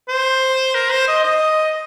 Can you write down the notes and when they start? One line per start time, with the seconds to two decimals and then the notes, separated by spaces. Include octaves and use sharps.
0.08 C5
0.74 A#4
0.91 C5
1.08 D#5
1.24 D#5